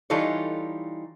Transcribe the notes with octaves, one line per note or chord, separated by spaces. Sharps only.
E3 G3 D#4 F4 A4 C#5